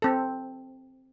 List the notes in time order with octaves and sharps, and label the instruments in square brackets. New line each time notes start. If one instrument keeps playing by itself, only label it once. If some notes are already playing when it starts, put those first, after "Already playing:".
[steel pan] C4 A4